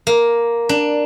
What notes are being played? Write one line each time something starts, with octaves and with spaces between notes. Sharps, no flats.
A#3
D4